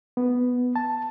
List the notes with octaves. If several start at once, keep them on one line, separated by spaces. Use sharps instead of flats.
B3
A5